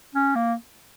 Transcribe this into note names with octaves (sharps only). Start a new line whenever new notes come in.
C#4
A#3